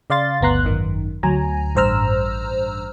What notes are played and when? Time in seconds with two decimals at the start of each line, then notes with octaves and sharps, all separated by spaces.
0.10 C#3 D5 F5 C6 A6
0.41 G1 D2 B3 A#5 C6 F#6
0.64 G#1 F#2 D#3
1.23 D2 F#3 G#5 A#5
1.75 A1 G2 C5 A#5 E6 F6